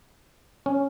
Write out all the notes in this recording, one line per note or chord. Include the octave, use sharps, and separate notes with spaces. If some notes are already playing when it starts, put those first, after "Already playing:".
C#4